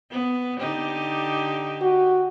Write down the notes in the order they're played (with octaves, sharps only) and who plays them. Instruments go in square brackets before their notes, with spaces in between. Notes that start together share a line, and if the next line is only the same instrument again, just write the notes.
[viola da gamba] B3
D3 D#4 G4
[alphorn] F#4